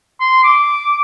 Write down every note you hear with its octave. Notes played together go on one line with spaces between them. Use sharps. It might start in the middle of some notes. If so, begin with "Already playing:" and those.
C6
D6